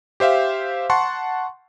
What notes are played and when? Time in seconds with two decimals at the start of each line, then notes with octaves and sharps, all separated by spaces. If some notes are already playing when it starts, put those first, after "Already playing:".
0.20 G4 C5 E5 F5
0.90 F#5 A5 C6 C#6